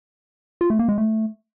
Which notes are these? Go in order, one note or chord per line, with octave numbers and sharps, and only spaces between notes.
F4
A3
A#3
G#3
A3